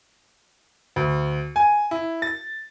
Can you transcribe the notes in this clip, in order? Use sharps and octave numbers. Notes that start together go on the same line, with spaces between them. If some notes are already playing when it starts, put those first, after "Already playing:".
D2
G#5
E4
A6